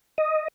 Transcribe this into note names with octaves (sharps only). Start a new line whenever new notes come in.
D#5